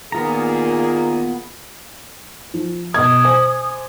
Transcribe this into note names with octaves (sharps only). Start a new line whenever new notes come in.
A#2 D#3 A#3 B3 F4 G#4 A#5
F3
B2 D#5 D#6 G#6
C5 G#5 D6